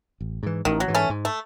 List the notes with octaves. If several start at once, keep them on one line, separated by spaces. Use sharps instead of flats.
A1
G#2 E3
A1 D#3
F#3
G#2 E3
A3 C#4
G#2
A3